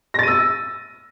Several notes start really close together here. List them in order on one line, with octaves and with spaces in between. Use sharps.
A#6 A6 D#7 E6